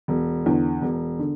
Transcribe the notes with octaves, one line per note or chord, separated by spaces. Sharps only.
E1
E2 D3
E1
D3